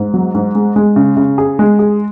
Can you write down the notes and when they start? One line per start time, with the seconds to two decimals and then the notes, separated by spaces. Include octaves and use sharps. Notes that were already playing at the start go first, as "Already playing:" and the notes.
Already playing: G#2
0.14 F#3
0.35 G#2
0.55 G#3
0.76 G#3
0.96 C#3
1.17 C#3
1.38 G#4
1.59 G#3
1.79 G#4